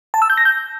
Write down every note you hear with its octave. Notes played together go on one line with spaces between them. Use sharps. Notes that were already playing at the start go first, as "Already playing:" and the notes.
A5
E6
G6
A#6
G6